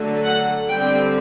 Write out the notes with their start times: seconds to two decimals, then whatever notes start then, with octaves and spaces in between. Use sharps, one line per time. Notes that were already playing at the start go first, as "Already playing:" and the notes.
Already playing: D3 F#3 A3
0.23 F#5
0.69 D3 G3 C4 G5